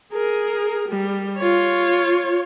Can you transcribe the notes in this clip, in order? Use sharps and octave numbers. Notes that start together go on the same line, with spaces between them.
G#4 A#4
G3
F4 C#5